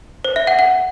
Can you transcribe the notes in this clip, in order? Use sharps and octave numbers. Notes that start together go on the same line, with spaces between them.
C5
E5
F#5
F#5